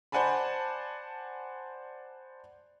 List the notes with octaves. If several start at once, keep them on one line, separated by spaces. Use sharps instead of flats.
C5 D5 F#5 G#5 A5 B5